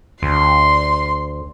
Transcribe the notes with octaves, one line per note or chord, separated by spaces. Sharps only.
D2 C6